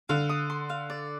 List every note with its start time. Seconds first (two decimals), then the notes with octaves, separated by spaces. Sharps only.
0.09 D3 F5
0.29 D#6
0.50 C6
0.70 F5
0.90 D5